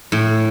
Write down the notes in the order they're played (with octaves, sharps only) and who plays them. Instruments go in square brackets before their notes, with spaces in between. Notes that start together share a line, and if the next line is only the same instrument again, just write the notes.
[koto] A2